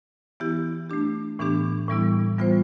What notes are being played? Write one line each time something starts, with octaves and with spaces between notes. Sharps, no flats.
E3 B3 E4 G4
A3 D4 G4
A2 E3 B3 D4 G4
A2 E3 G3 B3 E4
E3 G3 B3 F4 C5